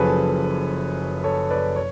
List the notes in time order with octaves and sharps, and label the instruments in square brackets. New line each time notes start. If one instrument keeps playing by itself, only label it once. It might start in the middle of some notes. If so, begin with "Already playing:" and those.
Already playing: [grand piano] F#1 F#2 F3 G#4 A4 B4 C#5
A4 C#5
B4 D5
C#5